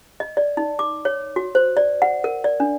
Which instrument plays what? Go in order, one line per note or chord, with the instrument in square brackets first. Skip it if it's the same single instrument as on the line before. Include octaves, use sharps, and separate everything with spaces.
[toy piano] D#5
D5
D#4
D6
C#5
F#4
C5
D5
F#5
A#4
D5
D4